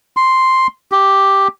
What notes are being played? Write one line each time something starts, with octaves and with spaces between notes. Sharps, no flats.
C6
G4